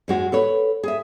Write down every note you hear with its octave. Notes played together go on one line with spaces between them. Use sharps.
F#2 G#3 F#4
A4 B4 C#5
G#4 E5